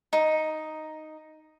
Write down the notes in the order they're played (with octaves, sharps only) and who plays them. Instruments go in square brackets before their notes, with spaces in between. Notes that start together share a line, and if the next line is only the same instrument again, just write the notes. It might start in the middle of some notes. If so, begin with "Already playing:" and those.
[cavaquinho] D#4